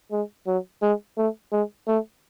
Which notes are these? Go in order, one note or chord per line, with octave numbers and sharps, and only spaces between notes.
G#3
F#3
G#3
A3
G#3
A3